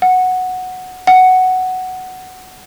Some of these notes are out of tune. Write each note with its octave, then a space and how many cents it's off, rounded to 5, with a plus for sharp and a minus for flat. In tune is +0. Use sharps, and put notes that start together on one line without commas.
F#5 -5
F#5 +5